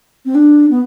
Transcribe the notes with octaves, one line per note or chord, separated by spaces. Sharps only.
C4
D4
B3